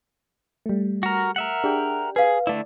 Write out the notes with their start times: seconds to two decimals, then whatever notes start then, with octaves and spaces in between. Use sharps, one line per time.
0.66 G3 A3
1.03 F#4 A#4
1.36 A#4 E5 F#5
1.64 D4 G4 G#4 G5
2.16 G#4 B4 F5
2.47 D3 A3 E4 D5